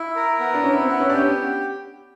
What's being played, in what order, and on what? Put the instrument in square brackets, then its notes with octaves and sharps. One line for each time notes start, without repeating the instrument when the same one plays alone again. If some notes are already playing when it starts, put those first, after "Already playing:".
Already playing: [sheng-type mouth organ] E4
A#4
B3
[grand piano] D4
[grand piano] C#4 [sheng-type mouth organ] E4
[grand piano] C4
[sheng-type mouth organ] B3
[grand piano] C#4
[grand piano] D4 [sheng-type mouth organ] G4
[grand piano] C#4